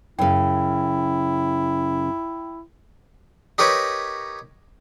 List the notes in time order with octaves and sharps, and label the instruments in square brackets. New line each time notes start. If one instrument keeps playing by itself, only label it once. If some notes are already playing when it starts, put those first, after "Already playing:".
[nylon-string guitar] F#2 C#3 [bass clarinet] E4 [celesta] G5
[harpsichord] D#4 G4 A#4 B4 C#5